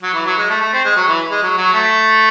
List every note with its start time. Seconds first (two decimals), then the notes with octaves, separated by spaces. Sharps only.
0.03 F#3
0.14 E3
0.26 F#3
0.38 G#3
0.50 A3
0.61 A3
0.73 C4
0.85 G#3
0.96 F#3
1.08 E3
1.31 G#3
1.43 F#3
1.58 F#3
1.73 A3